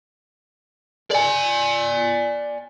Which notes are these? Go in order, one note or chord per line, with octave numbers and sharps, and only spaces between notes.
D5 G#5